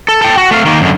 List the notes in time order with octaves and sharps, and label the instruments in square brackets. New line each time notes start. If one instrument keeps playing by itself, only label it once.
[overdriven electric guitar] A4
A4 G5
F#4
A3 F5
D#3 A#3
F#2 D3